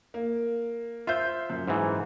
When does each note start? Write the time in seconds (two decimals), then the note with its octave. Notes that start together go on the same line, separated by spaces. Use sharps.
0.14 A#3
1.07 F4 C5 E5 G6
1.50 F#2
1.68 G#2 E3